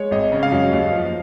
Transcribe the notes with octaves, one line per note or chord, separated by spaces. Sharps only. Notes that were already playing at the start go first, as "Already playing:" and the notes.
Already playing: G#3 C#5
G#1 D#5
C#3
F5
F#2
D#2
F3